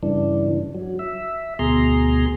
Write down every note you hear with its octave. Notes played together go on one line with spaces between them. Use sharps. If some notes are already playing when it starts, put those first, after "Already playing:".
G2 C#3 E3 D4
F#3
E5
D2 B2 G#4 A#5 C6